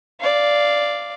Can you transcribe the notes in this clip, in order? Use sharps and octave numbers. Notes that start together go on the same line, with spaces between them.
D5 F5